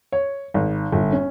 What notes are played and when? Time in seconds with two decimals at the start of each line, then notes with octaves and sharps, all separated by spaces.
0.12 C#5
0.54 G#1
0.92 G1
1.12 C#4